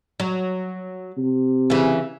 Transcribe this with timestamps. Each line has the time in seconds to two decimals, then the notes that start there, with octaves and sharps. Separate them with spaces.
0.20 F#3
1.18 C3
1.70 C#3 E3